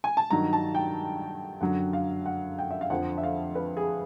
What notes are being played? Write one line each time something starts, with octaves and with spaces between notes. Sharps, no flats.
G#5
A5
G2 D#3 F#3 A#5
A5
G5
F#2 D3 F#3 F#5
F5
F#5
G5
E5
F5
F2 D3 F3 F#5
E5
F5
B4
G#4